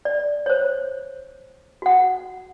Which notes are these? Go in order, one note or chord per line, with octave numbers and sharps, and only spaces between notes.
D5
C5 C#5
F#4 F#5